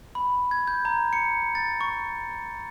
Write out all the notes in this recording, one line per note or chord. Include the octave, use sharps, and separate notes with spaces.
B5
G#6
G6
A#5
C#7
A6
C#6